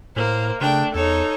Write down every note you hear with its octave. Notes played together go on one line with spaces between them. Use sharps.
A2 A#3 C5
C#3 A3 D4 G5
E2 D#4 A4 C#5